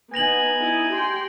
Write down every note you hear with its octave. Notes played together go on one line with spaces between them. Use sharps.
B3 D#4 G#5 A#6 F7 F#7
D#4 E4
G4 G5 C6